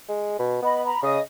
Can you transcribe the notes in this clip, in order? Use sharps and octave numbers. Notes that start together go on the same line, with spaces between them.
G#3
B2
B3 D#5 B5
A#5 B5
C#3 D#5 D#6